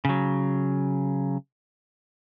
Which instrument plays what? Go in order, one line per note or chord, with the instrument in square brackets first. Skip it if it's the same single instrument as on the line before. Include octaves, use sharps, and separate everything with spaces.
[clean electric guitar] C#3 F#3